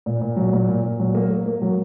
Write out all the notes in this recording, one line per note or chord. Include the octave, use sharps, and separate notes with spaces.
A#2
A#2
F#3
A#2
A#2
A#2
F#3
A#3
A#3
A#3
F#3